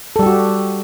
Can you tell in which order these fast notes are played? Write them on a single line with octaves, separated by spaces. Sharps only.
A4 G3 G4 F#4